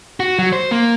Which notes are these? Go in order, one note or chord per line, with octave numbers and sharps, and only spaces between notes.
F#4
F#3
C5
A#3